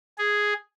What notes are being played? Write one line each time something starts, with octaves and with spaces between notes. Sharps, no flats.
G#4